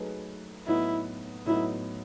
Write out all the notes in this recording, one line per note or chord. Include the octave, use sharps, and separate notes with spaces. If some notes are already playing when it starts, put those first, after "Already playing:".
Already playing: F#3 A3 D#4 G#4 B4
A2 F#3 B3 D#4 E4
A2 F#3 B3 D#4 E4